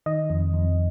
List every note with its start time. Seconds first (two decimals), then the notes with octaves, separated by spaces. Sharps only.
0.06 D#3 D#5
0.30 F2
0.54 F2